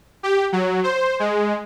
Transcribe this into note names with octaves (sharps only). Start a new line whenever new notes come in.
G4
F#3
C5
G#3